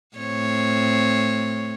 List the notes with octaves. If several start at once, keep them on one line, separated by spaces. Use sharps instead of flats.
A2 C4 C#5